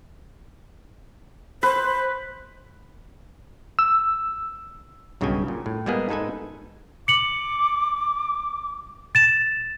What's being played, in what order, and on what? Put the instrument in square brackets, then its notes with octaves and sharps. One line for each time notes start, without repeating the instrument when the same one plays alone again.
[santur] B4 [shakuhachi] C5
[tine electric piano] E6
[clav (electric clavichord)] B1 G2 C#3 F#4 G5 G#5
A#2
A2
G3 G#3 A#3 B3 G#4
G#2 G#3 D#4 A4 B4 G#5
[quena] D6 [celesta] C#7 F#7
[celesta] A6 E7